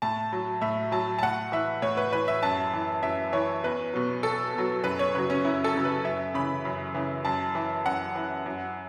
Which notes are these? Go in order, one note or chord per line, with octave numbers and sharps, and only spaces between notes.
A2 A5
F#3
A2 E5
F#3 A5
A5
A2 F#5
E3 E5
A2 C#5
B4
E3 B4
E5
F#2 A5
E3
F#2 E5
E3 C#5
E2 B4
B2 F#3
E2 A4
B2 F#3
F#2 B4
C#5
C#3 F#3 B4
C#4
F#2 E4
A4
C#3 F#3
B4
F#2 E5
C#3 E3 B5
F#2
C#3 E3
F#2 A5
E3
F#2 F#5
E3
F#2